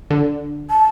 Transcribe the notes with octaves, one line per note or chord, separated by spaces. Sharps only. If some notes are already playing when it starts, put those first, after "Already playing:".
D3
A5